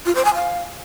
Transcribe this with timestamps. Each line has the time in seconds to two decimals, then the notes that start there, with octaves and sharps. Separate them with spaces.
0.06 F4
0.15 C5
0.25 G#5
0.34 F5